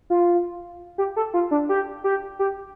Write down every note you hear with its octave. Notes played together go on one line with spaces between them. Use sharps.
F4
G4
A4
F4
D4
G4
G4
G4